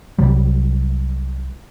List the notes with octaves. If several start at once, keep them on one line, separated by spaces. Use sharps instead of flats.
C2 C3 F#3 G3